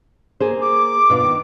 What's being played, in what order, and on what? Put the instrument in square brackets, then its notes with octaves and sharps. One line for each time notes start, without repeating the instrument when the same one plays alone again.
[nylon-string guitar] A#3 G#4 C5
[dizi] D6
[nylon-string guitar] B2 D4 F4
D#3